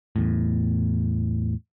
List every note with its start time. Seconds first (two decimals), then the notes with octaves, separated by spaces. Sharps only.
0.16 E2 A2